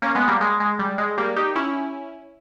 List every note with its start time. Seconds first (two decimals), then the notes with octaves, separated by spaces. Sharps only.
0.02 A#3 C#4
0.15 G#3 B3
0.28 G3 A#3
0.41 G#3
0.60 G#3
0.79 G3
0.98 G#3
1.18 G3 A#3
1.36 D#4 G4
1.56 C#4 E4